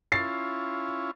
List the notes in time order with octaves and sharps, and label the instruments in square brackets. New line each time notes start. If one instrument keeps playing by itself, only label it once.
[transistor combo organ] C#4 E4 F4 [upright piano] A6 C7